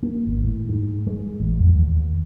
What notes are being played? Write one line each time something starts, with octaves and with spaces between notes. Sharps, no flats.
A#3
G#1
A2
G#2
G#3
A1
F2
D#2